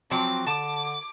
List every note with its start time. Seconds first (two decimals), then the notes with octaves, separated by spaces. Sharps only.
0.11 F3 F#3 C4 D6
0.47 D3 A5 D6